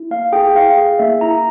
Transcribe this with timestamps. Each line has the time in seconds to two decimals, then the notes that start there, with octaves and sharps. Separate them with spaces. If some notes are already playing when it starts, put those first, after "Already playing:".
Already playing: E4
0.11 A#3 F5
0.33 G#4 G5
0.55 E4 F5
0.78 G#4
0.99 A#3 E5
1.21 E4 A#5